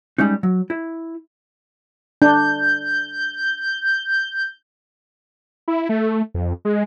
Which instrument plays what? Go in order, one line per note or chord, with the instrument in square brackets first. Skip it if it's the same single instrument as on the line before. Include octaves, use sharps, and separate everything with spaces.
[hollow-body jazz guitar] G3 G#3 C#4 D#4
F#3
E4
[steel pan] D4 [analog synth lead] G6
[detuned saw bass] E4
A3
F2
G#3